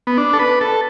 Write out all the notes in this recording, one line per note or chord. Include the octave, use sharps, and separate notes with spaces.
B3
D4
A4
B4
A4